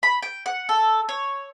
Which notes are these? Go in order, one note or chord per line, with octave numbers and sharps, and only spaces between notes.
B5
G5
F#5
A4
C#5